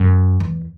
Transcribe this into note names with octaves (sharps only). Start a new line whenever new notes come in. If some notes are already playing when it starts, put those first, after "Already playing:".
Already playing: F#2
E2